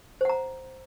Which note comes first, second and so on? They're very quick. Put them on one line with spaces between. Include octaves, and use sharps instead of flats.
C5 F#5 A#5